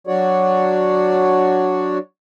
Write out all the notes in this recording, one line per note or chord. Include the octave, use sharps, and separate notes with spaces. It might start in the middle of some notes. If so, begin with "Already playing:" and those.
F#3 D4 F#4 C#5 D5